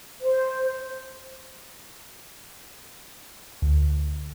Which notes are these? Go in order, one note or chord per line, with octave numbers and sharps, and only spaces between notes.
C5
D2